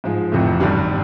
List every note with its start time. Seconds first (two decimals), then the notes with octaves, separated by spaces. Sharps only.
0.04 G#2 F3 G#3
0.32 F1 F2 C3 E3 A3
0.60 G#1 G2 D3 G3